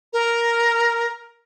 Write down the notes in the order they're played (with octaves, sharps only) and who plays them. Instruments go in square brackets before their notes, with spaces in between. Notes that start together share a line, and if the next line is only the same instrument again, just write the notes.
[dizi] A#4